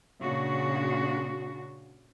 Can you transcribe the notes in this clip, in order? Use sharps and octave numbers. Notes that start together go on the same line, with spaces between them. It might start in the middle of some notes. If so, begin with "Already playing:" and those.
A#2 C#3 D4 F#4